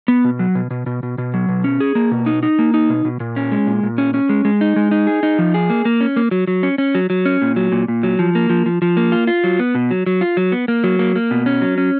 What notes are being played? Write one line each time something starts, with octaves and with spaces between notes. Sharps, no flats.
B3
B2
F#3
B2
B2
B2
B2
B2
F#3
B2
C#4
G#4
A#3
B2
D#4
D#4
A#3
D#4
B2
B2
A#2
C#4
G#3
A#2
A#2
C#4
C#4
G#3
G#3
D#4
G#3
D#4
G#4
D#4
F3
G#4
A#3
A#3
C#4
A#3
F#3
F#3
C#4
C#4
F#3
F#3
C#4
A#2
F#3
A#2
A#2
F#3
F3
A#3
F3
F3
F3
A#3
F4
F4
F#3
B3
B2
F#3
F#3
F4
F#3
B3
A#3
F#3
A#3
A#3
B2
C#4
F#3
C#4